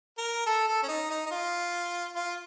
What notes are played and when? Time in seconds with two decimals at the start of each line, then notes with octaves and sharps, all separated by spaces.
0.18 A#4
0.47 A4
0.68 A4
0.83 C#4
0.88 D#4
1.10 D#4
1.26 D#4
1.31 F4
2.16 F4